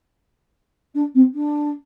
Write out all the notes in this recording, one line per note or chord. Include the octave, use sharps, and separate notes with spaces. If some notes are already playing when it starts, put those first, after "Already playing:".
D4
C4
D4